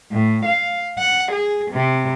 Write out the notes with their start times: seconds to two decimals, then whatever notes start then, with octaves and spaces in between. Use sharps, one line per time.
0.11 A2
0.45 F5
0.98 F#5
1.32 G#4
1.71 C3